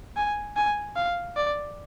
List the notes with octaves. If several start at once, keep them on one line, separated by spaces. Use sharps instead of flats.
G#5
G#5
F5
D5